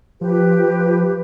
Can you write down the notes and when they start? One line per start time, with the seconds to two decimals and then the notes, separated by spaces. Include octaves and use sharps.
0.21 F3 G4 B4